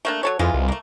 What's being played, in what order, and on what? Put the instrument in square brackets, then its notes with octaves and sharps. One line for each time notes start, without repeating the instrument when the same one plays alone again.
[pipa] A3 A#3 D4
F#3 A4 C#5
[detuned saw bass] F2 [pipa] E3 G#3 F4
[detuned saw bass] C2
[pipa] A3 A#3